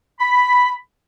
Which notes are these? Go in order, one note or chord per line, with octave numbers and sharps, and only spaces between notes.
B5